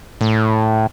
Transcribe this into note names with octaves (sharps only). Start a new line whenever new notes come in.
A2